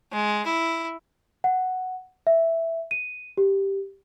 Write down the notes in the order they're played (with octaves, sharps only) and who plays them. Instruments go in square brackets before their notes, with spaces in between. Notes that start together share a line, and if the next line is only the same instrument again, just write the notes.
[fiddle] G#3
E4
[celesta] F#5
E5
D#7
G4